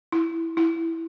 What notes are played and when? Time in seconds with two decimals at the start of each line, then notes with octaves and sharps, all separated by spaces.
0.12 E4
0.57 E4